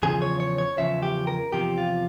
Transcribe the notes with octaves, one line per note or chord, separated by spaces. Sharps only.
E2 C#3 F3 G#4
C#5
C#5
C#5
E2 C#3 F3 E5
G4
A#4
E2 C3 F3 G4
F4